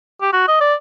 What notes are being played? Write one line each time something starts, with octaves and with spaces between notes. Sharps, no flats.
G4
F#4
D#5
D5